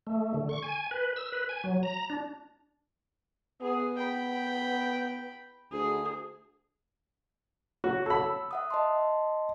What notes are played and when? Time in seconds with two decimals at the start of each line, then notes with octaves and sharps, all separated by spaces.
0.07 A3
0.34 D3
0.49 C#6
0.62 G#5
0.91 B4
1.16 E6
1.32 B4
1.49 G#5
1.64 F#3
1.83 A#5
2.10 D4
3.61 B3 G#4
3.98 G5 B5
5.72 D2 G#4
7.84 F#4 C#5
8.06 A4 B5 E6
8.51 E5 F#5 D#6
8.70 D#5 A5 C6